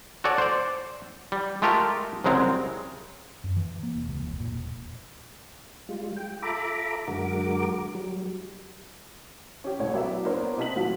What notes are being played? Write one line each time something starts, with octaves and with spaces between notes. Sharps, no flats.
F#4 A4 C#5 D5 G#5
C5 D5
G3
G#3 A3 F4 G4 A4 A#4
C2 C#3 F#3 G#3 C4 A#4
F#2
E3
A#3
E1
C#2
F1
A#2
E1
G3 G#3 F4
G5
F4 A4 E5 A#5 B5 D6
F#2 D3 G#3 F#4 A#4 D6
F#3 G3
C#4 G4
C2 A2 C#5
F#3 B3 A#4 D5 E5
A#3 B3 D4 A#4 C5 C#5
C3 E4 D#5 A5 B6 F#7
A2 E3 F#3 F4 F#4